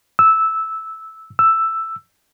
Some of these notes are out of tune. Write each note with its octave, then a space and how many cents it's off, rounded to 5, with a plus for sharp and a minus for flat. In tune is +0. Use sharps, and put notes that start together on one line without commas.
E6 -10
E6 +5